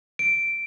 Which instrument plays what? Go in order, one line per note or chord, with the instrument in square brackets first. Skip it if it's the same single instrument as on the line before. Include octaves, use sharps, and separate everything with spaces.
[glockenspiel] D7